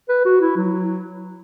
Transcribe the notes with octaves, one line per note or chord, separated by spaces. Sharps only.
B4
F#4
E4
F#3